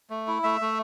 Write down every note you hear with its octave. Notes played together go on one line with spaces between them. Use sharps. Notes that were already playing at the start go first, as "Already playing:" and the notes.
A3
E4
A3 E5
A3